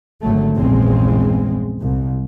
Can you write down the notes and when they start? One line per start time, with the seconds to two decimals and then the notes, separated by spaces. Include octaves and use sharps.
0.22 G#1 D3 F#3 A3
0.55 A#1 E2 G2 C#3 G#3 C4
1.81 C2